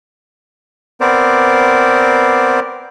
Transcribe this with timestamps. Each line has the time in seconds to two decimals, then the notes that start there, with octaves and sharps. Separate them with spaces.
1.01 B3 C4 A#4 C5 D5